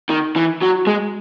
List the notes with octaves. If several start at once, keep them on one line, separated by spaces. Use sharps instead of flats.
D#3
E3
F#3
G#3